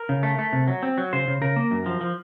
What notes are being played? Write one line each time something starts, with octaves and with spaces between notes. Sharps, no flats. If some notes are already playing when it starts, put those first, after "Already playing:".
Already playing: A#4
C#3
A3
A3
C3
F#3
C4
F#3
C#3 C5
C#3
C#3 A#4
A#3
F#2
F3
F3